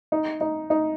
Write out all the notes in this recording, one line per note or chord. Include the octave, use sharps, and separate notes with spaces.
D#4
D#4
D#4